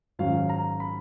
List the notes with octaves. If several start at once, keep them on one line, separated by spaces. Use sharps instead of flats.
G#2 D#3 F#3 C#4 F5
A#5
B5